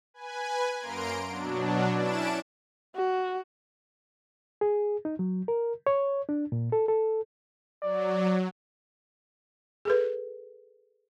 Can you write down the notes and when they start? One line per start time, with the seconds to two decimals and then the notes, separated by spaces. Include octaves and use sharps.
0.14 B4 G#5
0.79 F#2 A#3 A#5 C6 D7
1.28 B2 F#3 D4
1.96 C#4 D4 E4 A5 D7 E7
2.95 F#4
4.61 G#4
5.05 D#4
5.19 F#3
5.48 A#4
5.87 C#5
6.29 D4
6.52 A#2
6.72 A4
6.88 A4
7.82 F#3 D5
9.85 G#4 A4 B4